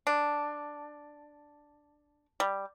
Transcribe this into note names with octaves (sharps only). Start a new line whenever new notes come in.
D4
G3